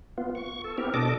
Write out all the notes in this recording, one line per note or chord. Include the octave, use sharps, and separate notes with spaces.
B3 F4
C#6
A4
B3 C4 E4 G4 A#4
B2 D4 A4 D#5 D6